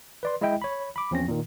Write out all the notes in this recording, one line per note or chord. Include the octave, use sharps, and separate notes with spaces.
B4 D5 C6
G#3 E4 D#5 E5 G5
C#5 B5
B5 D6
E2 F3 C4 C#4 A#6
A#2 D#3